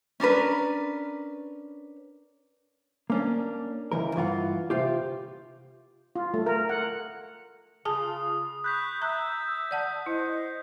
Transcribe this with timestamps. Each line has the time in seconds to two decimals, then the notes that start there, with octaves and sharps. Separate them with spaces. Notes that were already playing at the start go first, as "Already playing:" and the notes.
0.20 C#4 D4 A#4 B4
3.10 A#3 C#4 D4
3.92 C#2 E3 A#4
4.16 G2 E3 F4 F#5
4.70 C3 F4 G4
6.16 F4
6.34 A3
6.46 A#4
6.69 F#5
7.85 C#3 F4 G#4 G#5 A5 D#6
8.64 B5 C#6 F#6 G6 B6
9.02 E5 A#5 E6 F#6 G6
9.71 D5 F#5 A5
10.06 E4 C5 D#5